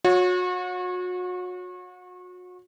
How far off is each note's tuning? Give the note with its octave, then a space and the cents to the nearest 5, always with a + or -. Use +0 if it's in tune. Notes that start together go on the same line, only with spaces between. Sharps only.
F#4 -35 C#5 +0